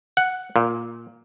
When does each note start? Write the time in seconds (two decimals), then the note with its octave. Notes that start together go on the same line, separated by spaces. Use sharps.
0.17 F#5
0.56 A#2